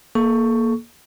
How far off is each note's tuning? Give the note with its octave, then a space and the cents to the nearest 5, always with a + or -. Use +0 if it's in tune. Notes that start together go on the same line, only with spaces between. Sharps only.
A#3 +0 A4 -35 C#6 +5